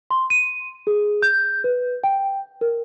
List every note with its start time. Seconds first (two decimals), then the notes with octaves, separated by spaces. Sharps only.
0.11 C6
0.30 D#7
0.87 G#4
1.22 G6
1.64 B4
2.04 G5
2.61 A#4